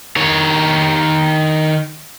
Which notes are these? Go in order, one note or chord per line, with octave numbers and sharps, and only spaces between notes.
D#3 C#5